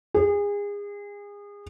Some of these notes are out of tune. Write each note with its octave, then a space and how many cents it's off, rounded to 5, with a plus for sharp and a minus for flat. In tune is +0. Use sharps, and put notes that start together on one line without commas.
G#4 -30